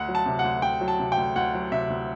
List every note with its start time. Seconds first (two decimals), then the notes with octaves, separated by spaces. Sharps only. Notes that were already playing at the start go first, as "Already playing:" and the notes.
Already playing: D2 F#5
0.09 F#3
0.15 A5
0.26 C3
0.39 F#5
0.44 D2
0.62 D2 G5
0.81 F#3
0.88 A5
1.00 C3
1.12 G5
1.17 D2
1.36 D2 F#5
1.55 F#3
1.72 C3 E5
1.90 D2